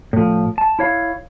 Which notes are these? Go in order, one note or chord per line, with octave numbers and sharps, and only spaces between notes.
A2 F3
A5
E4 C#5 F5